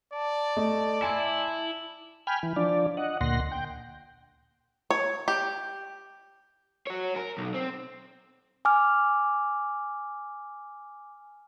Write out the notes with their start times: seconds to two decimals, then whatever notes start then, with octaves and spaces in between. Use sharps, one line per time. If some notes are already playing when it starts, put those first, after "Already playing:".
0.13 D5 A5
0.56 A3 D#5
1.02 E4 G#5 C6 D6
2.27 G5 G#5 B5 F6
2.43 E3
2.56 F3 D4 D5
2.97 D#5 F#5
3.21 D2 A#2 F#5 C6 A#6
3.52 G5
4.90 C#5
5.28 G4
6.87 F#4 C#5
7.16 A#4
7.38 B1
7.54 C4
8.65 G#5 D6 F6